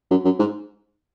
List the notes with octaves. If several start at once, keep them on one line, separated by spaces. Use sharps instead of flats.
F#2
F#2
G#2